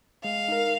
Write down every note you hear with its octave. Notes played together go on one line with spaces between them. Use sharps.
G#3 F5
D#4 A#4